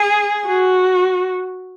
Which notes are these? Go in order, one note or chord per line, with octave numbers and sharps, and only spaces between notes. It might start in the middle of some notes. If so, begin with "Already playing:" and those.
Already playing: G#4
F#4